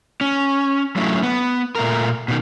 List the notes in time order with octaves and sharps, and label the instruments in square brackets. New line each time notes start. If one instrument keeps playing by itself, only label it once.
[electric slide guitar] C#4
F#3 A3 C#4 E4
B3
A#2 A3 A#4
B2 D#3